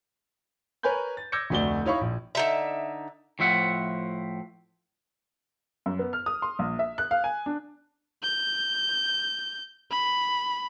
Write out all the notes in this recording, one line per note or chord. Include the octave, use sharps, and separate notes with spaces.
A#4 B4 C#5 G#5 B5 G6
A6
D6 E6 G6 G#6 A#6 C#7
F1 D2 A3 F#4 D5 G7
D#4 E4 C#5 F5 B5 C#6
A#1
D3 D#4 E5
A2 F3 C5 E5 F#5
F#2
B3
F6
D#6
C6
A#1
E5
F#6
F5
G#5
D4
G6
B5